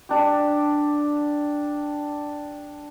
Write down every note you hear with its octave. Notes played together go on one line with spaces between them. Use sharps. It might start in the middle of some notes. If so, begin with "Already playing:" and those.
D4 G4